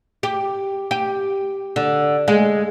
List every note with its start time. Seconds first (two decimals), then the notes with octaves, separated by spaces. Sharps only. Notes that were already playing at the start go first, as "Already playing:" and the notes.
0.23 G4
0.91 G4
1.76 D3
2.28 G#3